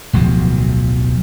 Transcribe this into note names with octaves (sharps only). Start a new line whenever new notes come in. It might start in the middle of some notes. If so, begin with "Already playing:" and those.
D1 B1 F3 F#3